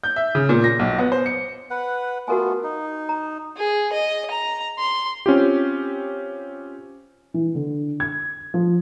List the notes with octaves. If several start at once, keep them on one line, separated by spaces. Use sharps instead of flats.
G6
E5
C#3
A#2
A#6
B1
B3
C5
C#7
B4 F#5
A3 B3 F4 F#4 A#4 G#5
D#4
A#5
G#4
D#5
A#5
C6
C4 C#4 F4 G4
E3
D3
G#6
F3